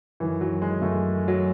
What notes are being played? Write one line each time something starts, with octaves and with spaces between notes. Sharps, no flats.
F#2 D#3 E3
F#3
G#3
F#2 D#3 A3
F#3